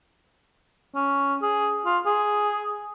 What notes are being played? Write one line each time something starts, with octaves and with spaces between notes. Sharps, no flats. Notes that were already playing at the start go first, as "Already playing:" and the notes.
C#4
G#4
F4
G#4